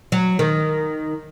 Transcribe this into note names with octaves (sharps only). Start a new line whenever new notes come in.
F#3
D#3